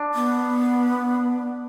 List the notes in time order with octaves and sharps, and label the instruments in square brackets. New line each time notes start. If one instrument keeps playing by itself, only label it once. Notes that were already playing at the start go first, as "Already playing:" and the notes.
Already playing: [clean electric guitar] D4
[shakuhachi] B3